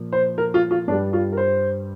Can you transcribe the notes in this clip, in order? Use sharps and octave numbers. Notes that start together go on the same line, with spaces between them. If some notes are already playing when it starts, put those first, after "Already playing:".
Already playing: A#2 F3
C5
A#4
F4
F4
G2 G3 D4
F4
A#4
C5